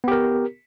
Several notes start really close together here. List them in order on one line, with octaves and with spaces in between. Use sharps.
B3 G4 A#4